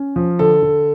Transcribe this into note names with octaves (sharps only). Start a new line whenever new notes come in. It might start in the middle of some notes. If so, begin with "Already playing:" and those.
Already playing: C#4
F3
D3 A4
D3